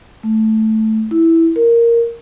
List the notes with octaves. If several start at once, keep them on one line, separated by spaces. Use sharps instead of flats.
A3
E4
A#4